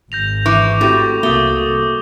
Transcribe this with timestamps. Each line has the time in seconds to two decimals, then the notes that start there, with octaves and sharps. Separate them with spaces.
0.12 G#1 G6 A#6 F7
0.46 E3 C#6 D6 F7
0.81 A2 C4 F#4 G4
1.23 C2 C3 A3 A#3 F#4 D#6 G7